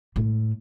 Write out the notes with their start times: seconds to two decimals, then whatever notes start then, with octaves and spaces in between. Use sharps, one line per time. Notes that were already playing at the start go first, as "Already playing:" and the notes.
0.16 A2